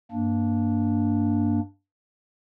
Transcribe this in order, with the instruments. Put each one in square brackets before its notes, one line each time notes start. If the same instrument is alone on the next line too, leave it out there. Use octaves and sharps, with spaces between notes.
[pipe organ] G2 A#3 D4